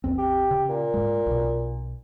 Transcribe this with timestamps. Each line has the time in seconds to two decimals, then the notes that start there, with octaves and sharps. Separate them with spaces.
0.04 A1 E2 C4
0.18 G4
0.51 C#3
0.69 A#2
0.94 G#2 G#3
1.26 B1 B2